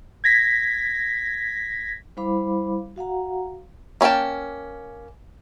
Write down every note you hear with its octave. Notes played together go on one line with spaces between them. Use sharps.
G#6 A#6 B6
G3 E4 C5 F5 B5 D6
F#4 F5 F#5 A#5
A#3 C#4 A4 G5 A5